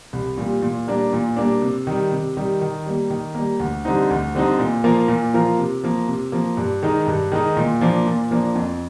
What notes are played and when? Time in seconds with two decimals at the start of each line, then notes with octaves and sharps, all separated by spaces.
0.13 C2
0.37 A#2 G3
0.62 A#2
0.87 G3 A#3 D4
1.13 A#2
1.37 G3 A#3 D4
1.62 C3
1.87 D#3 G3
2.11 C3
2.37 D#3 G3
2.61 D#3
2.86 G3 A#3
3.10 D#3
3.35 G3 A#3
3.60 D2
3.85 D3 G3 C4 D#4
4.10 D2
4.35 D3 G3 C4 D#4
4.59 A#2
4.84 F3 A#3 F4 A#4
5.08 A#2
5.33 F3 A#3 F4 A#4
5.58 C3
5.84 F3 A#3
6.08 C3
6.32 F3 A#3
6.57 G2
6.83 D#3 G#3 D#4
7.07 G2
7.32 D#3 G#3 D#4
7.57 A#2
7.81 F3 A#3 D4
8.06 A#2
8.31 F3 A#3 D4
8.55 F2